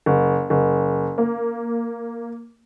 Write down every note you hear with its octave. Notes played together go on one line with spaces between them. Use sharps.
F#1
F#1
A#3